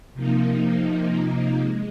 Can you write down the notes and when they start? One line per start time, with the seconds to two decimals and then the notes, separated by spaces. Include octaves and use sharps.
0.14 C3 F3 A#3 D#4
1.61 G#3